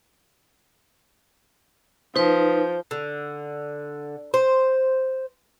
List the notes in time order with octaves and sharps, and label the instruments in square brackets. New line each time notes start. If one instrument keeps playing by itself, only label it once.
[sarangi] F3 [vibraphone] D#4 B4 [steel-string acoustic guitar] C5
[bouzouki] D3
C5